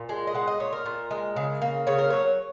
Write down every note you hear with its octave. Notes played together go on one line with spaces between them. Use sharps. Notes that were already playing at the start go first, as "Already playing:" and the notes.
Already playing: A#2
G#3
D#5
G#3 F#5
D#5
A#2 C#5
A#4
A#2
G#3
C#3
A#3
C#3 C#5
A#4
F#3 C#5